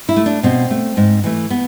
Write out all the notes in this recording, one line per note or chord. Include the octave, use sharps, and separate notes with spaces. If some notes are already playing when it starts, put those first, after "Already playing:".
E4
A3
D4
B2 C4
A3
G#2
E3 A3
B3